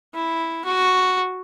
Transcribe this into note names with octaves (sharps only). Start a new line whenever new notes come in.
E4
F#4